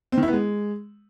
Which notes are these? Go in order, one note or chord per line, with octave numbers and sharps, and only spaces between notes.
C4
D#3
E4
B3
G#3